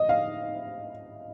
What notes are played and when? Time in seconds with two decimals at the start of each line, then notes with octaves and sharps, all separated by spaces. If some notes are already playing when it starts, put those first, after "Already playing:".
Already playing: D#5
0.09 F5